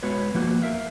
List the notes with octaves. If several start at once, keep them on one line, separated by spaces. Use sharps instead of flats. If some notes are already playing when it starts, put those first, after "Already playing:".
G#3 B3 F#4 B4 C#5
F3 A#3 F#4
A#4 E5 F5